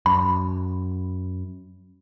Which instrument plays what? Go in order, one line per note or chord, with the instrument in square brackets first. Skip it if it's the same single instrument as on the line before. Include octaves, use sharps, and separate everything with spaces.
[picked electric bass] F#2 [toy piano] B5